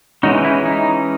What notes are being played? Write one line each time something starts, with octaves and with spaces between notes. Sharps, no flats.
E3 G#3 C#4 D#4 F#4
E4
D#4